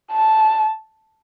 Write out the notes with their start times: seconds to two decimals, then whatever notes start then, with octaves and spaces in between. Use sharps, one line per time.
0.12 A5